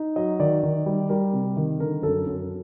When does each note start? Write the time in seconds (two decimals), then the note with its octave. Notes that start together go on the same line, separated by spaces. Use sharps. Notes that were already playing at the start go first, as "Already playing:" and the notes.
Already playing: D#4
0.16 F#3 D#5
0.40 D#3 D5
0.63 D#3
0.86 G3
1.09 G3 A#4
1.33 C3
1.57 D#3
1.79 D3 A#4
2.02 F#2 A4
2.27 F#2